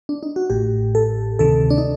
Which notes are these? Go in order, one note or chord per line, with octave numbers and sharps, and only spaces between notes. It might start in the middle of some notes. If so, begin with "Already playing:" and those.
D4
D#4
F#4
A1 A2 G4
A4
D2 C3 D#3 A4
D4
D#4